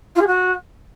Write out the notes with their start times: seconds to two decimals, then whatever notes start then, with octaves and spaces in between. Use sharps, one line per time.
0.15 F4
0.21 G#4
0.27 F#4